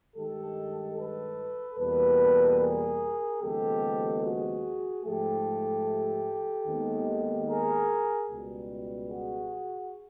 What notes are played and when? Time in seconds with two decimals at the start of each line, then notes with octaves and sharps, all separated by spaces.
0.16 G2 D#3 G#3 G4 A4
0.98 A4 B4
1.79 E2 B2 G3 A#3 A4 B4
2.60 G#4 A#4
3.41 D#2 C#3 F3 G#3 B3 G4 A4
4.23 F#4 G#4
5.04 G#2 F3 A3 G4 A4
6.66 D#2 D#3 G#3 B3
7.48 G#4 A#4
8.29 C#2 B2 G3
9.10 F#4 G#4